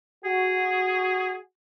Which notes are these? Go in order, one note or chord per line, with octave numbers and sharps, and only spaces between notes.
F#4 G#4